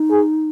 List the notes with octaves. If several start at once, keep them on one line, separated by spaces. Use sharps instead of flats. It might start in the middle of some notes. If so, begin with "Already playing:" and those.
Already playing: D#4
G#4